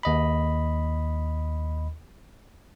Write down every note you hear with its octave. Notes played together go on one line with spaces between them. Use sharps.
D#2 D#5 B5